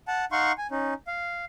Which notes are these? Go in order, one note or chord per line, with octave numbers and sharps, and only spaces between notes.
F#5 A5
D#4 F5 F#5 C6 C#6
G#5
C#4 D#4
F5